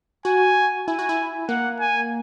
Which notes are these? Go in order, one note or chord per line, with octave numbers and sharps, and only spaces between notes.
F#4 G#5
E4 G#5
F#4
E4
A#3 F#5
G#5